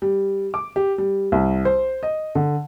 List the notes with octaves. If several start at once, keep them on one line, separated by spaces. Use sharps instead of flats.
G3
D6
G4
G3
C2
C5
D#5
D3